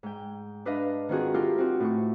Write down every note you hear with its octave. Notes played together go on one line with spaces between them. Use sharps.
G#2 G5
D4 B4 D#5 F5
D#3 C4 F4 F#4 G#4
E4 F4 G4 A4 A#4
C4 D#4 F#4
A2 E4 C#6